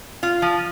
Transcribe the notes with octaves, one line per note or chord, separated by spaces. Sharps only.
F4
F3